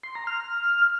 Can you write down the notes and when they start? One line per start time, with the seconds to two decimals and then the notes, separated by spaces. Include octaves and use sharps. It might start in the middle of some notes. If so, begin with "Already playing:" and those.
0.04 C6
0.15 A#5
0.27 F6